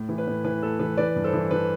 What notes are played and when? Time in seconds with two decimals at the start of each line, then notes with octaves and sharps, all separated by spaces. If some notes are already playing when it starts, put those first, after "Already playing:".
Already playing: A2
0.09 E3
0.18 B4
0.27 A2
0.44 E3 B4
0.62 A2 A4
0.79 E3 B4
0.97 E3 B4 D5
1.16 G2
1.24 A4 C5
1.33 E3
1.51 E3 B4